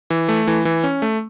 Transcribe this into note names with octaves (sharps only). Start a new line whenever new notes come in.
E3
A3
E3
E3
C#4
A3